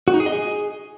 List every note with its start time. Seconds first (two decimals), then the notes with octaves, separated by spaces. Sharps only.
0.08 F#4
0.14 D#4
0.20 G#4
0.26 D#5
0.32 G#4